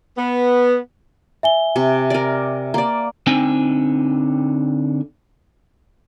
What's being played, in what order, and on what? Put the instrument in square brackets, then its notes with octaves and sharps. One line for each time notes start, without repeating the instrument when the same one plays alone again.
[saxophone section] B3
[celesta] E5 G#5 G7
[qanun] C3
A#4 D5
A#3 D5
[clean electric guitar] D3 C4 D#4 G5 G#5